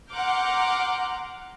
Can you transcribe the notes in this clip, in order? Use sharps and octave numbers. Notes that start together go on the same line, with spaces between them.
F#5 A#5 C6 D6 F6 G6